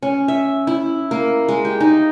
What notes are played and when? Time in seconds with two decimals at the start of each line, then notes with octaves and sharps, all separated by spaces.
0.03 C#4
0.28 E5
0.67 E4
1.11 A#3
1.49 G#3
1.65 G4
1.80 D#4